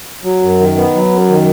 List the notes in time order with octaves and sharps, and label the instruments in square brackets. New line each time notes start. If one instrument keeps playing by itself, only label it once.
[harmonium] F#3
F#2
D#3
B3
F#3
F#2
D#3